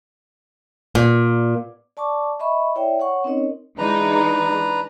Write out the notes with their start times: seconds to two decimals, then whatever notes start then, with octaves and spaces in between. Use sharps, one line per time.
0.95 A#2
1.97 D5 A5 C#6 D6
2.40 D#5 E5 B5 C#6
2.75 E4 C#5 D5 E5 G5
3.00 C#5 F#5 C#6
3.24 C4 C#4 D#4 A#4 C#5 D#5
3.78 E3 G#3 D4 D#4 B4 A#5